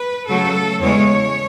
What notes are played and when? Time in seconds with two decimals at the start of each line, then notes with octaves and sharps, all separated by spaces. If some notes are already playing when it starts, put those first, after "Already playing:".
Already playing: B4
0.28 C#3 F#3 A3 A4
0.80 E2 C#3 G#3 C#5